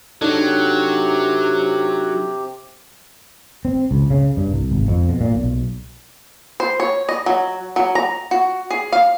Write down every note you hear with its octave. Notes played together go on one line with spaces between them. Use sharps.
C3 F#3 D4 D#4 G4 A4
C4
C#2
C#3
G2
C2
G#1
F2
B2
A#2
B1
C5
C#5
D#5
F#3
F#3
A#5
F#4
G#4
F5